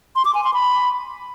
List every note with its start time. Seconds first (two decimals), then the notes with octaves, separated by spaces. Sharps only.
0.16 C6
0.25 D6
0.35 G#5
0.44 C6
0.54 B5